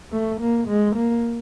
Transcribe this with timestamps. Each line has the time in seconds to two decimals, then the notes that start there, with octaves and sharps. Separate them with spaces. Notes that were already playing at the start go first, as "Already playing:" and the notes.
0.12 A3
0.40 A#3
0.68 G#3
0.96 A#3